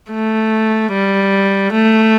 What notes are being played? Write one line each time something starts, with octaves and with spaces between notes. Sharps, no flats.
A3
G3
A3